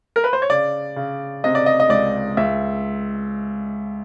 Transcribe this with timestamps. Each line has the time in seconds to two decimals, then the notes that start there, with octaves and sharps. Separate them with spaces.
0.16 A#4
0.24 B4
0.33 C5
0.42 C#5
0.50 C#3 D5
0.96 C#3
1.44 C3 D#5
1.55 D5
1.66 D#5
1.80 D#5
1.90 C#2 D5
2.37 C#2 E5